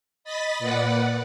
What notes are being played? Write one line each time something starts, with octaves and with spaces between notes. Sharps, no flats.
D#5 B5 A6 B6
A#2 B4 D5 F#5